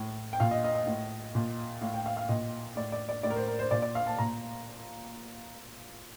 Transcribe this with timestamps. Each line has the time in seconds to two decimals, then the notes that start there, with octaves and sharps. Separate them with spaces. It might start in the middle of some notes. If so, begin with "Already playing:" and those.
Already playing: A2
0.33 G5
0.40 A#2 F5
0.51 D#5
0.64 D#5
0.75 D#5
0.87 A2
1.35 A#2
1.81 A2 F5
1.94 G5
2.06 F5
2.17 F5
2.29 A#2 D#5
2.76 A2 D5
2.92 D5
3.09 D5
3.23 A2 D5
3.30 A#4
3.36 C5
3.47 A#4
3.59 C5
3.71 A#2 D5
3.82 D5
3.95 F5
4.07 A5
4.18 A#2 A#5